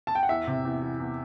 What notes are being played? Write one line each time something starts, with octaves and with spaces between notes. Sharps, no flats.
A5
G5
F#5
E2 E5
C3
E2
E3
E2